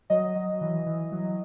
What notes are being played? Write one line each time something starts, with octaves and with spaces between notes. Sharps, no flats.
F#3 D#5
F#3
E3
E3
F#3